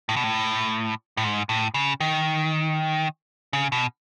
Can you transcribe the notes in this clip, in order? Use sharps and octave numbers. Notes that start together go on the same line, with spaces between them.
A2
B2
A2
A2
G#2
A2
C#3
D#3
C#3
B2